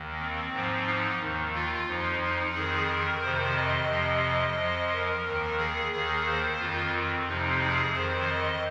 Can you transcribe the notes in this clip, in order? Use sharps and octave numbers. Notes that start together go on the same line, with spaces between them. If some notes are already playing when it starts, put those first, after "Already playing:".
Already playing: D#2 D#3
C4
G#2 F3
D#4
D#2 D#3
F4
F2 F3 D#4
D#4
F2 D#3 G#4
A#4
F2 C3 D#3 C5
D#5
F2 C3 F3
F2 F3
A#4
D#2 D#3
G#4
D#2 D#3 G#4
C5
F2 D#3 F4
C4
F2 C3 F3 D#4
G#4
F2 D#3 C5
D#5